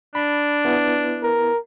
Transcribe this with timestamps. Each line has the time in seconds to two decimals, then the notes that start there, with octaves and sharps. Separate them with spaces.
0.15 D4 B5
0.65 B3 E4 B4
1.23 A#4